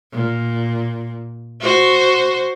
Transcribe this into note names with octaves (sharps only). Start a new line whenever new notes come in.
A#2
F#4 C5